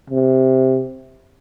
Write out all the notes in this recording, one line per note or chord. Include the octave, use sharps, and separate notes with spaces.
C3